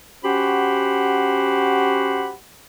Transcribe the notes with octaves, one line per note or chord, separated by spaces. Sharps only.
C#4 F#4 G4 C5 F#5 B5